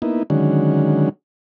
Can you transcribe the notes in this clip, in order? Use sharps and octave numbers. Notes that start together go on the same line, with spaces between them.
A#3 B3 D#4 E4
D3 D#3 F#3 G#3 C#4